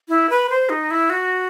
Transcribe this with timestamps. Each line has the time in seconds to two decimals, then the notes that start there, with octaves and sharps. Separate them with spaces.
0.09 E4
0.30 B4
0.50 C5
0.69 D#4
0.91 E4
1.10 F#4